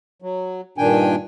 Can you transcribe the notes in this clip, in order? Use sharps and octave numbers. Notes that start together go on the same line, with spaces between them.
F#3
G2 A#2 D#3 D4 G5 G#5